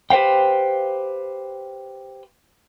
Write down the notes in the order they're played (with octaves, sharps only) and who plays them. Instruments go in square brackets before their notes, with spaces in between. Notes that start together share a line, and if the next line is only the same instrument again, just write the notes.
[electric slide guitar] G4 B4 C5 F5 G5